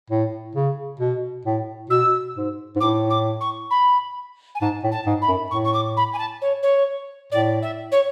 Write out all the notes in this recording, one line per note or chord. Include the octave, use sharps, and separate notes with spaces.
A2
C#3
B2
A2
B2 E6
G#2
G#2
A2 D6
D6
C#6
B5
G#5
G#2 A5
A2
A5
G#2
B5
F#2
A2 C#6
C#6
D6
B5
G#5
A5
C#5
C#5
A2 D5
E5
C#5